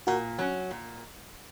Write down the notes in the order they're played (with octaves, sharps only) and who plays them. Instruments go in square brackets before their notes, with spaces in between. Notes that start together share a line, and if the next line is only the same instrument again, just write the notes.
[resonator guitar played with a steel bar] A#2 [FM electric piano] F#4 A#4
[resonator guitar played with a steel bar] F#3 C#4
A#2